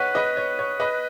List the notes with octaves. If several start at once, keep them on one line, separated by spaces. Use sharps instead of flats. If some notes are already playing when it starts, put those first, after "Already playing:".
Already playing: B4 C#5 D#5 F#5 F#6 B6 D#7
B4 D#5
C#5
C#5
B4 D#5